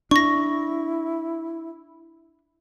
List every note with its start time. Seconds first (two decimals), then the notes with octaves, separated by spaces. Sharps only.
0.11 D4 E4 C#6 A#6